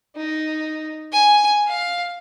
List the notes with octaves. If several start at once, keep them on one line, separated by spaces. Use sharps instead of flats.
D#4
G#5
F5